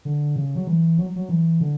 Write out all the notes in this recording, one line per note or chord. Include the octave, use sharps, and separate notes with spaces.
D3
C#3
F#3
E3
F#3
F#3
E3
D3